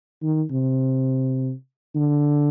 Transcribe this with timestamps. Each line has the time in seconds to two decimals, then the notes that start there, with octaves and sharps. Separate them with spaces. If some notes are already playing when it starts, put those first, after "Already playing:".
0.22 D#3
0.51 C3
1.95 D3